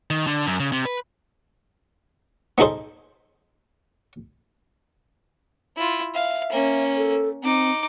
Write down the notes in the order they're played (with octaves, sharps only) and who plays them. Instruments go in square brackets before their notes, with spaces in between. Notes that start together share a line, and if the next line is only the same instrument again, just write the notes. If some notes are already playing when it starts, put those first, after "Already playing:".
[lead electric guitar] D#3
D3
F#2
C#3
C3
B4
[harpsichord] B3 D#4 G#4 A4 C5
[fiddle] E4 F4
[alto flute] E5 [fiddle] F5
[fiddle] A#3 C#4
[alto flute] A4
[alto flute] C4 [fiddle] D#4 D6